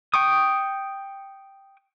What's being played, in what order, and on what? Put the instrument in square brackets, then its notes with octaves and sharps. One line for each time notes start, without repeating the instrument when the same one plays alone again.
[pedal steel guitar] G5 C#6 D#6